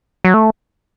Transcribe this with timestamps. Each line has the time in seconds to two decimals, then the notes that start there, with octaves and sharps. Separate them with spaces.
0.25 F#3
0.34 A3